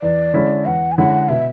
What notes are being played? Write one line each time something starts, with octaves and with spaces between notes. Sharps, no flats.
E2 D5
D3 G#3 C#4 E4
E2 F#5
G#5
D3 G#3 C#4 E4 F#5
B2 E5